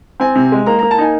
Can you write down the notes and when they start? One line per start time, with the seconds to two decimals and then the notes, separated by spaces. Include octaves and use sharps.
0.20 C4 G#5
0.35 C3
0.52 G#3
0.66 A#3 A#5
0.79 A#3 A#5
0.91 A5
0.98 D#4 G#5